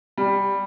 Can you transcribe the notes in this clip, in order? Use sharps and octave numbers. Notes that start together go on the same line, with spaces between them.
G3